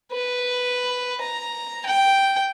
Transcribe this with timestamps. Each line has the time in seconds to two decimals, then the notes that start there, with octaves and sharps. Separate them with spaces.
0.12 B4
1.21 A#5
1.86 G5